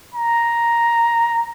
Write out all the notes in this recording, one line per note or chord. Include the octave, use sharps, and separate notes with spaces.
A#5